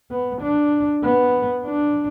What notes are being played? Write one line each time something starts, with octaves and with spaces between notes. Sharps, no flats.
B3
D4
B3
D4